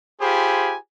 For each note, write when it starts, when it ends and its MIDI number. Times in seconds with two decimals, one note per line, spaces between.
0.21 0.76 65
0.21 0.76 67
0.21 0.76 68
0.21 0.76 72
0.21 0.76 80
0.21 0.76 83